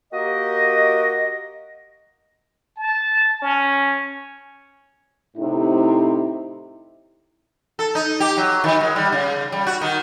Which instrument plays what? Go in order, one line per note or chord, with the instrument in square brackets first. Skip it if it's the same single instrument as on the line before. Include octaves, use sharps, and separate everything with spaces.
[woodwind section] A#3 F#4 G4 A#4 D#5
[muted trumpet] A5
C#4
[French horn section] A2 C3 D#4 E4
[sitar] A4
D#4
G4
F#3
D#3
G#3
G3
C#3
G3
F#4
D#3